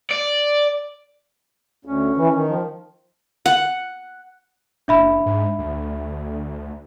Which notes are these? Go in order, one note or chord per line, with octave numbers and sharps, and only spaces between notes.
D5
D2 C#4
E3
D#3
F3
F#5
F#1 D4 E5 B5
G#2
D2